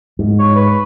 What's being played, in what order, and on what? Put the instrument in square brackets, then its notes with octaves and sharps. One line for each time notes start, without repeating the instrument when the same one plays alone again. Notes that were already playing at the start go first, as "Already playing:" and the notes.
[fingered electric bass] G#2
[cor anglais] C#5
B4